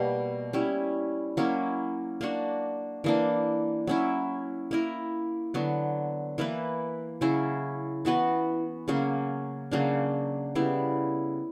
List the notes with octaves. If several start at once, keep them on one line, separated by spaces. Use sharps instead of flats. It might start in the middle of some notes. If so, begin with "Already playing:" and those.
Already playing: B2 G3 A#3
G3 C#4 E4
F#3 A#3 C#4 E4
A#3 D4 F#4
E3 A#3 D4
F#3 C#4 E4
A#3 E4 A#4
D3 F#3 B3
E3 A#3 E4 B4
C#3 F#3 C#4 E4
E3 B3 F#4 B4
C#3 F#3 A#3 C#4
C#3 F#3 A#3 D4
C#3 G3 B3 E4